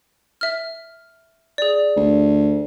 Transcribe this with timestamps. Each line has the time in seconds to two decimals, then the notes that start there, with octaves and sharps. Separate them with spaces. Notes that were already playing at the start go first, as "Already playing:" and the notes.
0.41 E5 F6
1.58 G#4 D5
1.96 D2